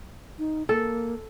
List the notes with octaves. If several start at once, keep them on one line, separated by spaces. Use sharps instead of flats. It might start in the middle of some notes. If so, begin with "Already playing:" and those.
D#4
A#3 A4